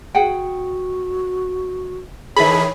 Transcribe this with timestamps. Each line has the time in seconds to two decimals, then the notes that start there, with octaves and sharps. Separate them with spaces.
0.15 F#4 G#4 F#5 G5
2.36 D#3 E3 G#4 A4 C#5 E5 B5